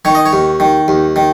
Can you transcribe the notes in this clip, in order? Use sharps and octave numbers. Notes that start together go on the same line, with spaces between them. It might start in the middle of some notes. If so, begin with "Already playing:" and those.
D#3 C#5
D#5
C#5
D#2
D#3
D#2
D#3